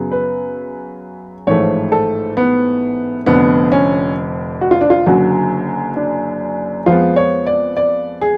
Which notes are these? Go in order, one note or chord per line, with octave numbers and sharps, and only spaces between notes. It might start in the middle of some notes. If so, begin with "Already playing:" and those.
Already playing: F#2 C#3 F#3 B3
B4
A1 G#2 F3 A3 C#5
A4
B3
F1 F2 D3 B3
C#4
F#4
F4
D4
F4
F#1 F#2 D3 F#3 F#4
D4
F2 F3 G#3 B3 F4
C#5
D5
D5
G#4